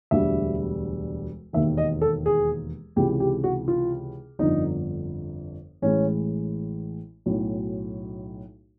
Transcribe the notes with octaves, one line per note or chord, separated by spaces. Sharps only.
E1 D2 D3 G3 E5
E1 D#2 D#3 E5
D#5
A4
G#4
C#2 C3 E3 G4
G4
F#4
F4
G1 F2 D3 D#4
A1 A2 E3 G#3 C#4
B1 A2 F#3